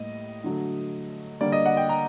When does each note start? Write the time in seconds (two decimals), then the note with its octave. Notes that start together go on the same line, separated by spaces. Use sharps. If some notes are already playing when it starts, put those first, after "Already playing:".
Already playing: A2 G3 A#3 D#5
0.44 D3 F#3 A3
1.41 D3 G3 A#3 D5
1.52 D#5
1.66 F#5
1.77 G5
1.89 A#5